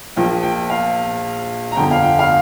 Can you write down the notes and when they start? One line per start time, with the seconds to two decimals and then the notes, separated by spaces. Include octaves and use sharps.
0.16 A#1 A#2 F3 A#3 G5
0.43 G5
0.70 F5
1.72 A#5
1.76 G1 F2 D3 G5
1.91 F5
2.03 G5
2.19 F5